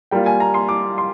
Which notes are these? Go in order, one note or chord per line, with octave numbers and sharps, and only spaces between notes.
G3 A#3 F4 G5
G#5
A#5
C6
D6
C6